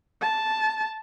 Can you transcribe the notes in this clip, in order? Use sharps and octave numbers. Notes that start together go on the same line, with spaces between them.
A5